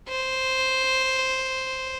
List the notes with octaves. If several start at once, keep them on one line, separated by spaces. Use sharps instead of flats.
C5